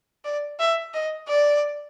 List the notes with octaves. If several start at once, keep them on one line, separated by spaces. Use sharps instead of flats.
D5
E5
D#5
D5